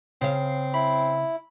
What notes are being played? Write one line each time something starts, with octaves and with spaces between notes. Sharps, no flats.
C#3 C4 F5
E4 B5